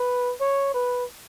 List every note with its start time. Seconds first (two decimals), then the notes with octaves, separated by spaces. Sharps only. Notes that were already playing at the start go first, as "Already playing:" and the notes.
Already playing: B4
0.41 C#5
0.74 B4